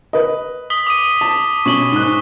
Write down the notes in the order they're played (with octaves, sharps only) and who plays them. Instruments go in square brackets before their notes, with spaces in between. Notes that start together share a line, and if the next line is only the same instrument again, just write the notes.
[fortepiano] B4 D#5
[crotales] D#6 B6 G7
D6 D#6 D#7
[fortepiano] A5
[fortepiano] B2 C#4 [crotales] C#6 F#7 G7
[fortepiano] G#2 F#6